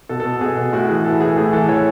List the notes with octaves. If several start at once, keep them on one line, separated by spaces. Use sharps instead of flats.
B2 A4
A4
B2
B2 G#4
B2
A2 F#4
E3 G#4
E3 A4
A2 G#4
A2 G#4
E3 A4
E3 C#5